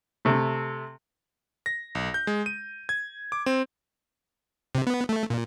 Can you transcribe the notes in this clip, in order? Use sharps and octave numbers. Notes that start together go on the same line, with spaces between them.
C3 A3
A#6
B1
G6
G#3
D#7
G#6
D6
C4
C3
B3
A3
A#2